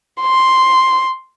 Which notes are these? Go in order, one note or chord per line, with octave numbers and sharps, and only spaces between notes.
C6